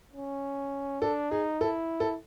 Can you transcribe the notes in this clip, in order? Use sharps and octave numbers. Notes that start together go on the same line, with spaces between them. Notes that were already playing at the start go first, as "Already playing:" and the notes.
C#4
D4 A4
D#4 G#4
E4 A4
A4